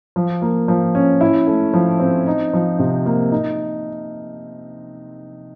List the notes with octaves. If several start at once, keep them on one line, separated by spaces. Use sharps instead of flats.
F3
A#3
F3
C#4
E4
A3
F3
C4
D#4
F3
C3
A#3
D#4